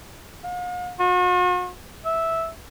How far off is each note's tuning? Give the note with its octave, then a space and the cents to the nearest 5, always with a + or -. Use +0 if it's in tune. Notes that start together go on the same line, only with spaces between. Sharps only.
F5 +45
F#4 -45
E5 -10